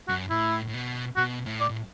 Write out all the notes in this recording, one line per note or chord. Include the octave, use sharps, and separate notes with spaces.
F#2 F#4
A2 E4
A2
B2
B2 F#4
A2
D5
A2